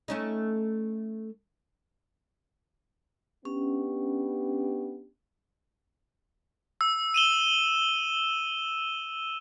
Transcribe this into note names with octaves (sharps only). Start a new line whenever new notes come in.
A3 C#4 D#4
B3 C#4 D4 G4
E6
D#7 E7 G7